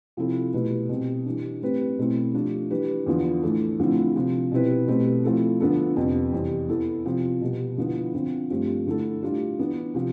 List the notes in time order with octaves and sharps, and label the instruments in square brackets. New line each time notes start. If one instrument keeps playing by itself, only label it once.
[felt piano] C3 F3 C4 E4 A4
B2 A3 E4 G4 B4
B2 G3 C4
E3 G3 D4
A2 G3 C4 G4 B4
B2 A3 C4 E4
F3 A3 D4 G4
E3 G3 D4 G4 B4
E2 D3 F3 B3 F4
A2 E3 A3 D4 A4
D3 F3 A3 C4 E4
C3 F3 C4
B2 G3 C4 E4 B4
B2 A3 C4 G4 B4
F3 A3 C4 E4 A4
D3 F3 B3 D4 A4
F2 C3 G3 B3 D4
E2 C3 G3 C4
E3 B3 E4 A4
C3 F3 C4
B2 G3 B3
D3 F3 B3 E4
D3 F3 C4
G2 F3 A3 C4 G4
D3 A3 E4 A4
A2 G3 D4 F4
E3 B3 D4
C3 F3